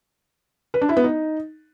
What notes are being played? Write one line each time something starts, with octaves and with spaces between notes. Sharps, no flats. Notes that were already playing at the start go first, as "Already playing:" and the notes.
B4
D4
E4
B3
D#4